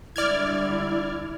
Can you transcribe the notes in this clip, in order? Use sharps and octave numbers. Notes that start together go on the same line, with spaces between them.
D3 G3 G#3 E4 D5 F6 G#6